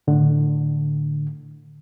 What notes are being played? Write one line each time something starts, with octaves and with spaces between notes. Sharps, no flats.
A2 D3